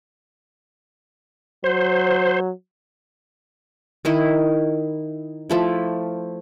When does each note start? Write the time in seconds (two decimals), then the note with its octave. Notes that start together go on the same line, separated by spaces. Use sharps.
1.64 F#3 C5
4.05 D#3 D#4 E4
5.50 F3 A3 E4